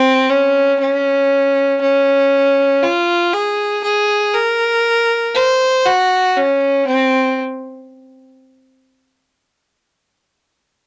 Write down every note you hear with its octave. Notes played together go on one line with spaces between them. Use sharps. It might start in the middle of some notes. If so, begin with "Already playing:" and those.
Already playing: C4
C#4
C#4
C#4
F4
G#4
G#4
A#4
C5
F#4
C#4
C4